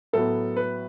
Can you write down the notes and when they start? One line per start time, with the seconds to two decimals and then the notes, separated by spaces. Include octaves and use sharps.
0.13 A2 F#3 B3 A4
0.57 B4